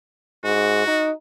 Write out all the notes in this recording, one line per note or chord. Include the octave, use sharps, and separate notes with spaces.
G#2 F#4
D#4